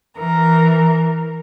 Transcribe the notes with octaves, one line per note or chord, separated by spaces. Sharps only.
E3 A#4